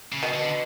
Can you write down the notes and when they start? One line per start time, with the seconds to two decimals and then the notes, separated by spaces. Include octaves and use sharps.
0.13 C#3
0.23 B2
0.34 D3